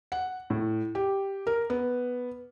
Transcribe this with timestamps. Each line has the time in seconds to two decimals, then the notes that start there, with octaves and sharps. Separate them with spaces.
0.12 F#5
0.50 A2
0.95 G4
1.47 A#4
1.70 B3